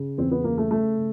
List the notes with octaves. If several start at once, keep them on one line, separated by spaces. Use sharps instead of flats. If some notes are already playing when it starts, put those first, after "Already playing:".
Already playing: C#3
E2 C4
B3
C#3 A#3
A3
C#3 A3
C#3